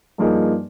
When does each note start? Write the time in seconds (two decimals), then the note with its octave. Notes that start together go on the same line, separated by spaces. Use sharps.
0.18 G2 F3 A#3 D#4 G#4